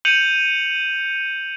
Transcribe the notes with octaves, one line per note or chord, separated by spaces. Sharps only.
G6 C#7 D#7 F7 F#7